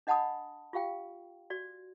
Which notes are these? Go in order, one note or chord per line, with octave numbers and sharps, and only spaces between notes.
D4 D#5 F#5 A5 B5 D#6
F4 G4 F5 G5
F#4 D5